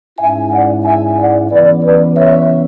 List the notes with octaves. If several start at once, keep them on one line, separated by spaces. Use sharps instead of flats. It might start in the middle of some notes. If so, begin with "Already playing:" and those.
G#2 G#3 C#4 E4 E5 G#5
D5 F#5
E5 G#5
D5 F#5
C#3 E3 B3 B4 D5
B4 D5
C#5 E5